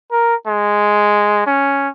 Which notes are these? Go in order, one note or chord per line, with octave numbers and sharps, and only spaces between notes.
A#4
G#3
C#4